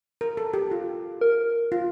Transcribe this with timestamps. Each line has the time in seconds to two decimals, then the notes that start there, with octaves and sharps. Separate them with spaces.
0.21 A#4
0.37 A4
0.54 G4
0.71 F4
1.21 A#4
1.72 F4